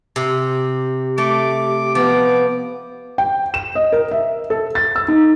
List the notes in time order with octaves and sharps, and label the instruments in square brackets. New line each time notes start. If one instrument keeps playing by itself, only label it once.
[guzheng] C3 [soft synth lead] G4
[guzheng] A3 [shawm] D6
[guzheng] F3 [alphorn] B3 [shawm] D6
[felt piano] G5
E7
D#5
A#4
E5
A4
A6
E6
D#4